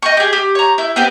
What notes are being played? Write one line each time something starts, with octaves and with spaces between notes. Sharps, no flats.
D#5 G5 C#6
G4 G#4
G4
C#5 A#5
E4 G6
B3 C4 G4